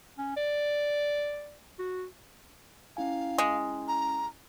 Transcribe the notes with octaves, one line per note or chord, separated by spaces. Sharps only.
C#4
D5
F#4
C#4 E4 F5 G#5
G#3
A#5